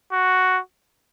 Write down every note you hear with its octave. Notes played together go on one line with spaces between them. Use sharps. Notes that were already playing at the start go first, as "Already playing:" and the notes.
F#4